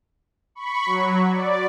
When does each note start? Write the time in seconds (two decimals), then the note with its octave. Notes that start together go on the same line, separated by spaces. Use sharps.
0.55 B5 C#6
0.86 F#3
1.30 D5